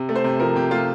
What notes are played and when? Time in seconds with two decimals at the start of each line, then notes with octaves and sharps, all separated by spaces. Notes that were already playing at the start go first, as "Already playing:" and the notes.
Already playing: C3
0.09 A3
0.15 C5
0.24 C3
0.39 F3 A#4
0.56 C3 G4
0.71 A3 F4